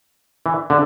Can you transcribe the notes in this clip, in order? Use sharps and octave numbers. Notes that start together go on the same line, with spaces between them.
E3
D3